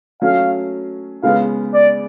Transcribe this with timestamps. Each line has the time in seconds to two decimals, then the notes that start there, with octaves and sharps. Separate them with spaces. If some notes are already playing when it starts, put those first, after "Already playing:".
0.22 F#3 A3 C#4 F5
1.23 C#3 G#3 B3 F5
1.74 D5